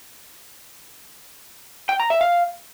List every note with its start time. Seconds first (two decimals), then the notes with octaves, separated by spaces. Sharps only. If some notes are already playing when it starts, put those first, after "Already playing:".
1.89 G5
2.00 A#5
2.10 E5
2.21 F5